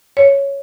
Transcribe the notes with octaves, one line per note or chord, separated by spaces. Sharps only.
C#5